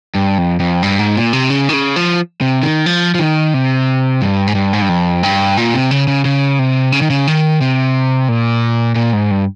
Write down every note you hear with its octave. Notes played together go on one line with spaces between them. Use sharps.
G2
F2
F2
G2
G#2
A#2
C3
C#3
D#3
C#3
F3
C3
D#3
F3
F3
D#3
C3
G2
G#2
G2
G#2
G2
F2
G2
A#2
C3
C#3
C#3
C#3
C3
C#3
D#3
C#3
D#3
C3
A#2
A#2
G#2
G2